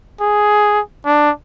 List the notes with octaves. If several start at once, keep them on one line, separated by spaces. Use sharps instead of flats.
G#4
D4